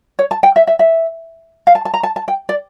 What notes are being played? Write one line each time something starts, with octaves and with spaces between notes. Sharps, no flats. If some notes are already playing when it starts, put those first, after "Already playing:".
C#5
A5
G5
E5
E5
E5
F5
A5
A5
A#5
A5
A5
G5
D5